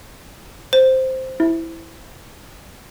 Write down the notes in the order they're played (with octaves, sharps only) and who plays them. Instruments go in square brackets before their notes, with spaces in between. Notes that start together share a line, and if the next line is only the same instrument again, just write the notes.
[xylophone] C5
[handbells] E4